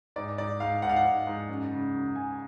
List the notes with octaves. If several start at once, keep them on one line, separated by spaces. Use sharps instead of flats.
G#2 D5
G#2 D5
G#2 F5
G#2 F#5
F5
F#5
G#2
G#2
F#2
C#3
F#2
C#3 G#5